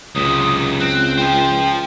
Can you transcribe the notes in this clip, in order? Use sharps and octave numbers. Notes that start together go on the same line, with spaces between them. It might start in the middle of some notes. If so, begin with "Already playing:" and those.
C#2 F#2 C3 D#6
C4 F#6
F3 C5 G5